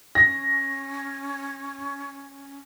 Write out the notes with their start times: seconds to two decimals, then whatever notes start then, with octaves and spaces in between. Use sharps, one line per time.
0.15 C#4 A#6